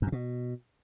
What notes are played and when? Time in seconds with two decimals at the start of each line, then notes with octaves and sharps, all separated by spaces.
0.02 F#2
0.07 A#2
0.12 B2